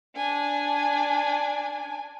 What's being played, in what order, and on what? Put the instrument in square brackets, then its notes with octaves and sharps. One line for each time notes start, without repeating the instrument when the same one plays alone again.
[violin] D4 G#5